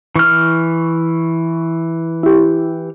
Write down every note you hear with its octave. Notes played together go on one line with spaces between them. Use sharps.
E3 C#6 F6
E4 G4